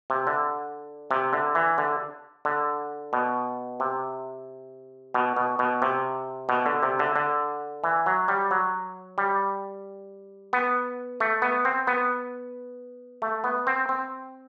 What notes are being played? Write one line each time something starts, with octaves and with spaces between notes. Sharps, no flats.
C3
D3
C3
D3
E3
D3
D3
B2
C3
B2
B2
B2
C3
B2
D3
C3
D3
D3
E3
F#3
G3
F#3
G3
B3
A3
B3
C4
B3
A3
B3
C4
C4